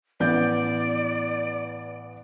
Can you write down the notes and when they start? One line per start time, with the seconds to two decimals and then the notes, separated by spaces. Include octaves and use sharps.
0.20 A1 B3 D5 G6